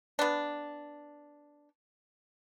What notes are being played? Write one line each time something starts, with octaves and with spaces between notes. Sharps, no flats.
B3 D4